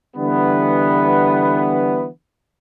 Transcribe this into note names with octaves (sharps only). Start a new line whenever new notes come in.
D3 E3 G3 B3